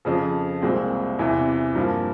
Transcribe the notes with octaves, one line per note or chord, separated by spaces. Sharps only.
F2 C#3 F3
C2 A#2 G#3 C4
E2 C3 E3
G2 F3 A#3